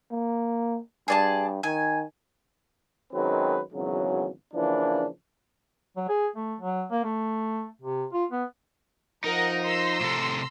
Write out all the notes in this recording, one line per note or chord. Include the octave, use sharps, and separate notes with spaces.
A#3
G2 G#4 D5 A5
D#3 G#5
F#2 D#3 F#3 G#3 C4 B4
G#1 E2 C#3 F#3
C#3 E3 F3 A#3 D4
F#3
G#4
A3
F#3
A#3
A3
C3
F4
B3
F3 D#4 A#4 D#5 F#5
A#5 C6 E6
A2 C3 A4